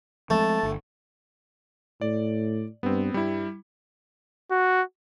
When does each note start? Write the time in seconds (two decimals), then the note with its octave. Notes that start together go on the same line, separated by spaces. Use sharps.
0.30 F3 G#3 A3 C4 A5
0.63 G1
2.01 A2 D5
2.83 G2 B3 C4
3.14 G2 G3 E4
4.51 F#4